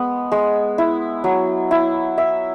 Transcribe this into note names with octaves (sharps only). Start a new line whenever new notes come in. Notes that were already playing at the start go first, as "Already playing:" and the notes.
Already playing: G#3 B3
G#3
E4
F#3
E4
E5